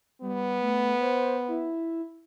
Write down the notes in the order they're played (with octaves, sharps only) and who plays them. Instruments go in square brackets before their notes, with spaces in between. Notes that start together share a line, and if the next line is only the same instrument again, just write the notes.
[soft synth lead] G3 [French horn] B3
[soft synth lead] A3
C5
E4